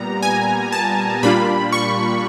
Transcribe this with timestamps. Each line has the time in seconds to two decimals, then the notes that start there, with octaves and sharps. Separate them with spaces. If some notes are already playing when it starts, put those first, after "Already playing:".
Already playing: A#2 G3 B3 A#5
0.23 G#5
0.72 A5
1.23 A#2 G3 A#3 D4 F4 B5
1.73 C#6